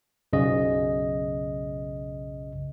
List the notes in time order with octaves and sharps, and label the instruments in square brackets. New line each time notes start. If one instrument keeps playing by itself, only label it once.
[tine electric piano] B1 F#2 C#3 D#5